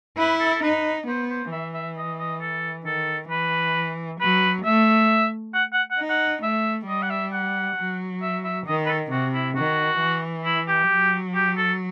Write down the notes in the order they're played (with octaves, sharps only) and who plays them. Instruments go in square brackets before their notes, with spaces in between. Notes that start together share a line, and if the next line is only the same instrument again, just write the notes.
[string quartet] E4 [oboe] B4
[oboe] A4
A4
[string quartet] D#4 [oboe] B4
[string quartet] B3 [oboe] C5
[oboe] C5
[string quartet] E3 [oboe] E5
[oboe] E5
D#5
D#5
A4
[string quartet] D#3 [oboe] A4
[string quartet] E3 [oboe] B4
[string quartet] F#3 [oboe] B4
[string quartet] A3 [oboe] E5
[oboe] F#5
F#5
F#5
[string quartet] D#4
[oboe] F#5
[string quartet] A3 [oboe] E5
[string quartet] G3 [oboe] D#5
[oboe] F#5
E5
F#5
[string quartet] F#3
[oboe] E5
E5
[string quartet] D#3 [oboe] D#5
[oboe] B4
A4
[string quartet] C3 [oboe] F#4
[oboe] E4
[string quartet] D#3 [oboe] F#4
[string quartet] E3
[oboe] E4
G4
[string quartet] F#3
[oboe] G4
A4